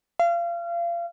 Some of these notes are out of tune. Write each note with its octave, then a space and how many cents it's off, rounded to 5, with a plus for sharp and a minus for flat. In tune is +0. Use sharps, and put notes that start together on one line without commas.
F5 -30